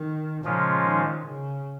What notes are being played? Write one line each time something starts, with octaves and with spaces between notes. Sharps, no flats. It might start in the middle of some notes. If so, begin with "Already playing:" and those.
Already playing: D#3
A#2 C#3 F3 G#3 C#4 F4
D#3
C#3